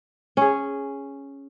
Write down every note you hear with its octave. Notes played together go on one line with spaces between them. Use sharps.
C#4 G#4